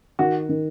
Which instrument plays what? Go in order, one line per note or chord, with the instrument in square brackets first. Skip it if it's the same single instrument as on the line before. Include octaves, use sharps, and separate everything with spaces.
[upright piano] D#3 [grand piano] F#4
[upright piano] D#3